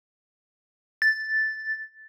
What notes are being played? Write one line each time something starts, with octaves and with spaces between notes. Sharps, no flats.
A6